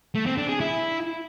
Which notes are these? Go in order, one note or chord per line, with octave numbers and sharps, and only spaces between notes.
A3
C4
D4
G#4
E4